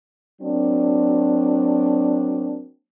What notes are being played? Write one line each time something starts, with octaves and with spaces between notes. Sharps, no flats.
F#3 A#3 C4 D4